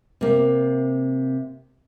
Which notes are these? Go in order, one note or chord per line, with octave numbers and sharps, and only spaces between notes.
C3 A#3